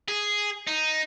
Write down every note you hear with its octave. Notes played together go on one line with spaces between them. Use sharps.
G#4
D#4